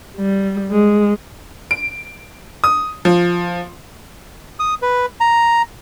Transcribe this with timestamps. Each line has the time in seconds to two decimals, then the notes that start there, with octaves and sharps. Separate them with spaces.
0.17 G3
0.70 G#3
1.71 D7
2.64 D#6
3.05 F3
4.59 D#6
4.82 B4
5.20 A#5